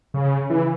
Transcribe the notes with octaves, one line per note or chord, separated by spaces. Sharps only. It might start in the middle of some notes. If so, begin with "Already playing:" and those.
C#3
E3